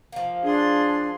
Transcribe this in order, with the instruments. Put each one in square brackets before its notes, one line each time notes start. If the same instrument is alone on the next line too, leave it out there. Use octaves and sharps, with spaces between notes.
[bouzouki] F3 A#3
[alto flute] D4 [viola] G#4 C6